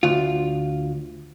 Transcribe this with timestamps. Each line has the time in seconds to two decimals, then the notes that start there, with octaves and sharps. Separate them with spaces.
0.03 D2 F4